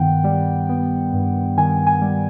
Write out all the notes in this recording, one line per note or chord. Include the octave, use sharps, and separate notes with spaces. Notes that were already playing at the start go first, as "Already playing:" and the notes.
Already playing: G2 D#3 B3 F#5 G5
G3
B3
G2
D#3 G#5
G#5
G3